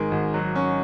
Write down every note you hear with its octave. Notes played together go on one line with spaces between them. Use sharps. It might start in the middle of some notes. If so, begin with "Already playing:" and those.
Already playing: G#1 D#3 G#3 A#4 D#5
G#1
F#3
C#4